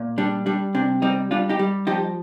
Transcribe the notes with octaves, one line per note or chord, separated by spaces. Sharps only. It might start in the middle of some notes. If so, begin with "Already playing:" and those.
Already playing: A#2
G3 D4
G3 D4
C3 D4
G3 C4 D#4
G3 D4 F4
D#4 G4
G3
F3 D#4 G4